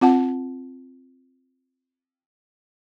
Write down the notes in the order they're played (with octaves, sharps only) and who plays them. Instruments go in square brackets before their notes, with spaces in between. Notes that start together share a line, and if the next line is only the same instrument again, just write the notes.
[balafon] C4 F4 F#5 A5